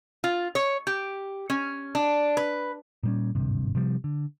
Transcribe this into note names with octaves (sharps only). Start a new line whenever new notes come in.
F4
C#5
G4
C#4
D4
B4
A#2 G3 C#4
D1 G#1 G2 C3
C3 F3 G3
D3